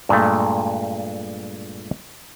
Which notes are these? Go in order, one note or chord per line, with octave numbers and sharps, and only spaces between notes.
G2 A#2 G#3 A3